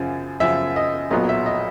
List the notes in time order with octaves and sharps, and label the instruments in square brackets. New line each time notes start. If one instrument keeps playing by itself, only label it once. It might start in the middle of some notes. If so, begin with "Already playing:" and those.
Already playing: [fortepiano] F#2 C#3 F3
F#2 C#3 F3 E5
D#5
B1 A#2 F#3 B3 D#5
E5
D#5